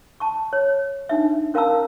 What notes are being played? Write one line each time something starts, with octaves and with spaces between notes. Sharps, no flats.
A5 C#6
C#5
D4 D#4 E5
C#4 A#4 F5 A5 A#5 E6